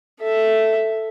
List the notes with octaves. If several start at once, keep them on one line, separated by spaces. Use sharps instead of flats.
A4 E5